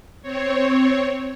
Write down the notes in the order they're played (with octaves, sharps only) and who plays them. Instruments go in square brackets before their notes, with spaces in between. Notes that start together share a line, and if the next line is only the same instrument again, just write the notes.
[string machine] C4 C#5